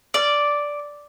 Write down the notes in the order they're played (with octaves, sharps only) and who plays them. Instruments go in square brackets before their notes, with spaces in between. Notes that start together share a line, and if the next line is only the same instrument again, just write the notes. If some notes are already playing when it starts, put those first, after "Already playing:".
[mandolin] D5